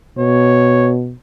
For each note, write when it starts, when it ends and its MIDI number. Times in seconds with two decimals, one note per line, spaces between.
0.18 1.14 47
0.18 0.93 73